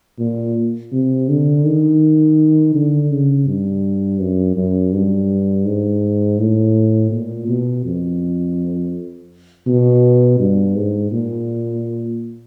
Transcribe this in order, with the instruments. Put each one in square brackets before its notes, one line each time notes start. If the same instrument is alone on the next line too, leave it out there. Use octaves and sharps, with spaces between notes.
[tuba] A#2
C3
D3
D#3
D3
C#3
G2
F#2
F#2
G2
G#2
A2
A#2
B2
F2
B2
G2
G#2
A#2